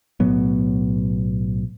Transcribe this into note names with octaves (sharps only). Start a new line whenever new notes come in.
B1 A2 F#3 B3